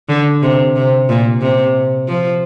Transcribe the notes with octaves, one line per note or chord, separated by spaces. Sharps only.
D3
C3
C3
A#2
C3
F3